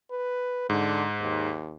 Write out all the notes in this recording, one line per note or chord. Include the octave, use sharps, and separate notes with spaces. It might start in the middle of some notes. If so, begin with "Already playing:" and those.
B4
G#2 D3
D#2